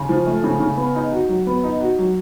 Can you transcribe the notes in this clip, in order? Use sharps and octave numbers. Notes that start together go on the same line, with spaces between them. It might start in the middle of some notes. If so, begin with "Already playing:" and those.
Already playing: C#3
F3
A3
C#3
C#3
B3
D#4
F#4
F#3
B3
D#4
F#4
F#3